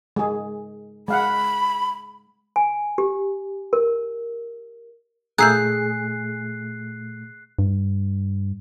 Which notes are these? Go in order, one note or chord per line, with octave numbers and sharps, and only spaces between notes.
G#3 G#4
G#3 F5 F#5 B5
G#5
G4
A#4
A#2 A3 G#4 A#5 E6 F#6 G6 C7
G2